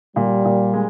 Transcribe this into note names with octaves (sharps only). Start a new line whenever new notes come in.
A#2 G3
A#2
G#3